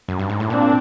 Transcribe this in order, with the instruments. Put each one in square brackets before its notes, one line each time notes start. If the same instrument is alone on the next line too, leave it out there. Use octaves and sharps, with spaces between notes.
[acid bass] F#2
G2
G#2
A2
[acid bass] A#2 [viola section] C4 D4